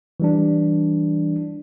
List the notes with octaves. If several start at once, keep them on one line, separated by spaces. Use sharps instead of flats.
E3 G3 D4